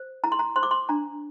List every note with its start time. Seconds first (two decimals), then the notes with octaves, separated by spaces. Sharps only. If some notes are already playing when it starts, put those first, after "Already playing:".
Already playing: C5
0.24 E4 A#5
0.32 C6
0.39 A#5
0.56 C5 C6
0.63 D6
0.71 C6
0.89 D4 A#5